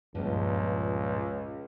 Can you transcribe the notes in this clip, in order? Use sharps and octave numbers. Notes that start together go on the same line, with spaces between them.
C#2 G2 A#2 F3